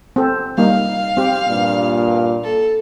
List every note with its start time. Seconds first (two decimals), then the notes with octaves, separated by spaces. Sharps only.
0.16 C4 A4
0.58 G3 A#3 D#4 F5
1.17 C4 G4
1.48 G2 A#2
2.44 A4